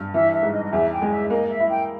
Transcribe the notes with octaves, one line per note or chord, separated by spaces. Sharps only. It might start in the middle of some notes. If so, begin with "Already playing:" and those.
Already playing: G2
E3 E5
E5
G#2
D#5
D#5
E2 E5
G5
G#3
E5
A#3 D#5
E5
E4
G5